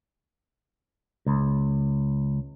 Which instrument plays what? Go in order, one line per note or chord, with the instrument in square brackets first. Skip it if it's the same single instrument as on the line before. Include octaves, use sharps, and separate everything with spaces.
[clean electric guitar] C#2